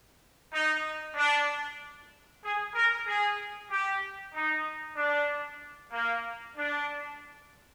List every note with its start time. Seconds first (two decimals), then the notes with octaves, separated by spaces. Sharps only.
0.53 D#4
1.16 D4
2.43 G#4
2.75 A#4
3.07 G#4
3.70 G4
4.34 D#4
4.97 D4
5.92 A#3
6.56 D4